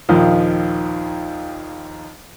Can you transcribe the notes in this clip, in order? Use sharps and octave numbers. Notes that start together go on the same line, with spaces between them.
A#1 D#2 D#3 F3